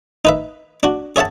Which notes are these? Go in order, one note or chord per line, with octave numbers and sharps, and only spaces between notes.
D#4 B4 E5
D4 F#4
G#4 C#5 E5 F#5 A5